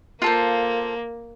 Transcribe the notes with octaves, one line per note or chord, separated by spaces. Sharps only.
A#3 F4 A4 C5